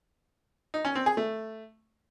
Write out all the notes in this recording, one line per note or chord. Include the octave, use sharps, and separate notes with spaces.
D#4
C#4
C4
G#4
A3